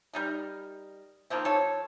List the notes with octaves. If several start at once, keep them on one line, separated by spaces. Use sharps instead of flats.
G3 D#4 A#4
D#3 F3 A#3 C4
F3 A4 C#5